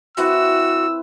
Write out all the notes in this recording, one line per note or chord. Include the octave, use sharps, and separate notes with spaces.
C4 E4 F#4 B4 E6